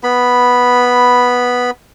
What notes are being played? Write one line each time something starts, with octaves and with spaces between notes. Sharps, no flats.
B3 B5